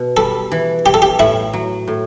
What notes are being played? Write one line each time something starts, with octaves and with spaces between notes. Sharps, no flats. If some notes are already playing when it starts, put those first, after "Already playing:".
Already playing: B2
G3 A4
E3
E3 G4
A4
G4
A2 E4
F#3
A2